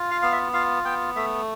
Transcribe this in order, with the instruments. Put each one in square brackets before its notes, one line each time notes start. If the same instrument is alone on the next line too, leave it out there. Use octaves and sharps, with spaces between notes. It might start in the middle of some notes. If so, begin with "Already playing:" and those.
Already playing: [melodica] F4
F5
B3 F5
E5
F4 F5
B3 G5
A3 E5